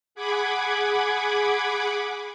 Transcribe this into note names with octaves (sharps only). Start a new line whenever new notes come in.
G#4 F#5 B5 D6 G#6